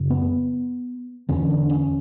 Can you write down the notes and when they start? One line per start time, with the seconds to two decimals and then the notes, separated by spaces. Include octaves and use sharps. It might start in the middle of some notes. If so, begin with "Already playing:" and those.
Already playing: F#2 C#3
0.10 B3
1.29 E2 D3 C#4
1.50 D4
1.70 C#4